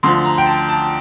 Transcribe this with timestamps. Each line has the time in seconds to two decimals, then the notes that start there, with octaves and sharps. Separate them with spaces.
0.03 D2 D3 F3 C6
0.25 A#5
0.38 G5
0.46 A5
0.68 A5